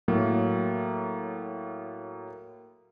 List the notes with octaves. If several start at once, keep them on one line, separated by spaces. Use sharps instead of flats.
A2 F#3 A#3